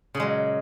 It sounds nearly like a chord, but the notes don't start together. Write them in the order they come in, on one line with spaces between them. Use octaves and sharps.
C#3 A#2 G#3 F#3